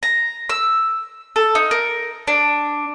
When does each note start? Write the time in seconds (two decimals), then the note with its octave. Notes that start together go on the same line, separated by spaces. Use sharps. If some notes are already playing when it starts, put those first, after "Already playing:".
0.03 A#5
0.49 E6
1.36 A4
1.55 D#4
1.71 A#4
2.28 D4